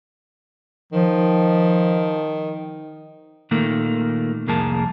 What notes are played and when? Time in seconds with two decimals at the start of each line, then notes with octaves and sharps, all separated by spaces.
0.93 D#3 F3
3.51 A#2 D#3 A3 A#3
4.47 C2 F2 A#3 G#4 A#4 A5